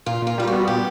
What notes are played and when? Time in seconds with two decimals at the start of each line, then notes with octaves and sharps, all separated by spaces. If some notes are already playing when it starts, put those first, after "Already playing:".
0.06 A#2 F4
0.22 A#2 F4
0.38 G3 F4
0.47 F#4
0.53 B3
0.68 A#2 G4